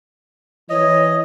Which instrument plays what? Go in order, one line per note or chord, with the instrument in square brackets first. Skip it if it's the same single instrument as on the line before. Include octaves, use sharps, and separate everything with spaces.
[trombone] E3 [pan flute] C#5 [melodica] D#5